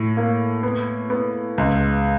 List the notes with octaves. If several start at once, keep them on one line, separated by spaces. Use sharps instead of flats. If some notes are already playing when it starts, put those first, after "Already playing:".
Already playing: A2
A#3
B3
B3
C#2